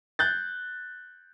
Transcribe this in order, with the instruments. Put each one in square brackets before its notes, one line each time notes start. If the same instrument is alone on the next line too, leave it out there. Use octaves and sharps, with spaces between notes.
[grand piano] F#6 G6 A6